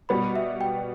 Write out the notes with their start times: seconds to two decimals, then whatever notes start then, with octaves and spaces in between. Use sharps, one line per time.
0.09 B2 G3 B3 B5
0.36 E5
0.61 G5